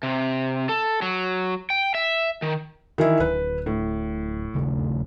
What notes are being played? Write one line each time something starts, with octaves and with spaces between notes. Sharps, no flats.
C3
A4
F#3
G5
E5
D#3
D#3 E3 E4
D1 B4
A2
D#1 C#3 A3